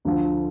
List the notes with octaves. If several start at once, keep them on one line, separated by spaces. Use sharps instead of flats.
D2 D3 F3